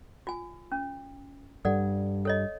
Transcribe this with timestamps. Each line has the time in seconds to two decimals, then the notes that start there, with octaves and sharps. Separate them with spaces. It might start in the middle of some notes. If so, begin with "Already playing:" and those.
0.27 F4 G#5
0.72 C#4
1.65 G2 G3 A4 D5 F#5
2.25 A4 C#5 D#5